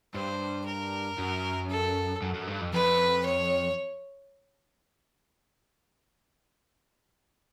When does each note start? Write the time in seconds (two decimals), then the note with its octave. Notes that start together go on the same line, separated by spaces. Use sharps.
0.14 G2 C5
0.66 A#4
1.18 F#2
1.70 A4
2.22 F#2
2.34 F#2
2.47 G2
2.61 F2
2.73 F2 B4
3.25 C#5